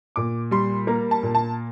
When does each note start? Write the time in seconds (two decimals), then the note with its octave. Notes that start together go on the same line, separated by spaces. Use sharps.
0.16 A#2 D6
0.51 G3 C6
0.87 A#3 A#5
1.11 A5
1.23 A#2
1.35 A5